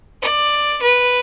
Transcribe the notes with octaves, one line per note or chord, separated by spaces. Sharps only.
D5
B4